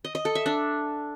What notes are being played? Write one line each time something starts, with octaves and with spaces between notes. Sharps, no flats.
D#5
D#5
A4
E5
D4